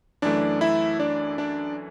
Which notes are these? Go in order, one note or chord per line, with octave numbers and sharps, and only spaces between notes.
F#2 E3 A3 D4 D5
E4 E5
D4 D5
D4 D5